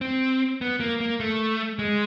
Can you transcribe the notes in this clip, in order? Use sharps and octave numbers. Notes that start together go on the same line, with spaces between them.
C4
B3
A#3
A#3
A3
G#3